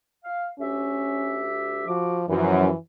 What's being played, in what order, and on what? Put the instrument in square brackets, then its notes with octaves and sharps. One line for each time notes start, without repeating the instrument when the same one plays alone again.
[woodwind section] F5
[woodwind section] D2 G4 E5 [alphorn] C#4
[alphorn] F3 [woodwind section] F#4 D6
[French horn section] F#2 [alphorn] E3 [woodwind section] F3